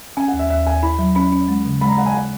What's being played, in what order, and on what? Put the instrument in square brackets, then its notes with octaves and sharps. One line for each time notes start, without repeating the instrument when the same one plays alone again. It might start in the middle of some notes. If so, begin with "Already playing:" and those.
[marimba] C#4 [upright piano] G#5
[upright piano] F#5
[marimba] D#2
[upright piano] E5
[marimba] D#2 [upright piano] E5
[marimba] D#2 [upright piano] G#5
[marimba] E4 [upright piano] B5
[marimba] F#3
[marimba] C#4 [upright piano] B5
[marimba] C#4
G#3
C#3
[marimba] G#3 [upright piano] B5
[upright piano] A#5
[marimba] G#3 [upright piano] F#5
[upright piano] G#5
F#5